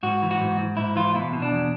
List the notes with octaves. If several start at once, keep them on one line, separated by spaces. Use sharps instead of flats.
G#2 F#4
E3
F#4
G#2
G#2
G#2 E4
E3 F4
B2 E4
B2
D4
E2